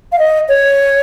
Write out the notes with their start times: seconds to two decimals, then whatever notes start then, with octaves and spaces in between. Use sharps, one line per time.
0.12 F5
0.19 D#5
0.49 C#5